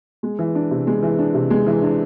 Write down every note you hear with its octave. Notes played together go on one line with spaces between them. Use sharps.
G#3
E3
D4
C3
G#3
E3
D4
C3
G#3
E3
D4